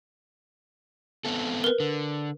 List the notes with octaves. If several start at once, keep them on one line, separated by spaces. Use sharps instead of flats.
B3 C4 A4
A#4 B4
D3